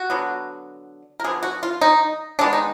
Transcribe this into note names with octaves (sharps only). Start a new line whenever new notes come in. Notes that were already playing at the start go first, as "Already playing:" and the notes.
Already playing: F#4
D3 F#3 B3
A#4
D3 F3 B3 G#4
F#4
F4
D#4
D#3 G#3 B3 D4
D#4